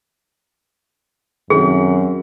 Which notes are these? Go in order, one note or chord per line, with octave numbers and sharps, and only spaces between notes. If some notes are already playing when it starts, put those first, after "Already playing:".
C2 F#2 D#3 G#4